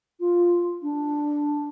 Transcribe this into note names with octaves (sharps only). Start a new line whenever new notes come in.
F4
D4